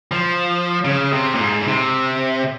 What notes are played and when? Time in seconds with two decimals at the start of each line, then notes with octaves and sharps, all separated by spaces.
0.12 F3
0.85 C#3
1.13 C3
1.34 A#2
1.40 G#2
1.61 A#2
1.67 C3